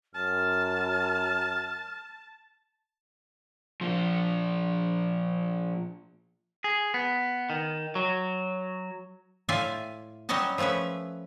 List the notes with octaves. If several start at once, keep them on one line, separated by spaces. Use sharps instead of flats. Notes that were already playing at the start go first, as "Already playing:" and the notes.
F#2 A5 F6
A#2 F3
G#4
B3
D#3
F#3
A2 F4 D5 E5 F5 G#5
F#3 G3 C#4 C#5 D#5 A5
F3 A3 C#4 B4 E5